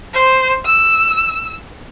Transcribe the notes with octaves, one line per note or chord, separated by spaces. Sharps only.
C5
E6